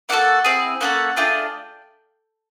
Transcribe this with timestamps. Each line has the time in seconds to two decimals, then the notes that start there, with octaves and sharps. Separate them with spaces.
0.09 A#3 D4 F#4 A4 F#5
0.45 C4 E4 G#4
0.81 A#3 C#4 F#4 A4 F#5
1.16 A3 D4 F4 G#4 G5